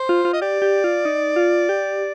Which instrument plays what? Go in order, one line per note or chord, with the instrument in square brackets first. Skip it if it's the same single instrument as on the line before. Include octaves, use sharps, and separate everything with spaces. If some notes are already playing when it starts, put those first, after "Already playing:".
Already playing: [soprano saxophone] C5
[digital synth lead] F4
F4
[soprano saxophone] D#5
[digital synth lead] G4 [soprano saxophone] D5
[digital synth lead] G4
F4
D#4
F4
G4